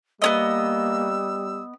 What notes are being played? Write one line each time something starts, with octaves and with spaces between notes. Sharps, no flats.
G3 A#3 B3 C#4 D#5 E6